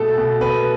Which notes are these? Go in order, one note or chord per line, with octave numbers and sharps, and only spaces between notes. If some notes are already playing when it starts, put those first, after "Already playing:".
Already playing: B2 A3 A4
B2
B2 B4